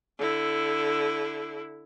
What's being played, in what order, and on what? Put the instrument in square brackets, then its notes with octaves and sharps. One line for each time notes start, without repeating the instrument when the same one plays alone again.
[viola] D3 E4